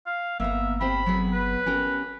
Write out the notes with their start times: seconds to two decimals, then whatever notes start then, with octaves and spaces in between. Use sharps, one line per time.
0.06 F5
0.40 G1 A#3 B3 E5 A#5
0.81 C4 G4 C5 B5
1.06 F#3 B3 G#4
1.33 B4
1.66 C#4 G4 A#4